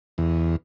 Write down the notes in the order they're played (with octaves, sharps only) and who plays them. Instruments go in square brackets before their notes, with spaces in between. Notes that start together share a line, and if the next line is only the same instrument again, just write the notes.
[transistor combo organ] E2